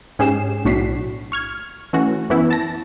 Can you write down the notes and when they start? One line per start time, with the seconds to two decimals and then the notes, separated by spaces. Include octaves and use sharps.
0.19 G#2 C#4 G4 G#4 C7 E7
0.65 B1 A2 D4 F#4 B6 C7
1.32 C#6 F6 G#6
1.93 E3 A3 C#4 F#4
2.30 F#2 E3 B3 E4
2.51 A5 A#6